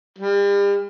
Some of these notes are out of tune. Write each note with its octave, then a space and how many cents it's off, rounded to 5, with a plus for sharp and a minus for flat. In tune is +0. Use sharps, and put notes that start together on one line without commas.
G3 +40